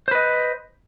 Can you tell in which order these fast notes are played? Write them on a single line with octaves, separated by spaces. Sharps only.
C5 B4 D#5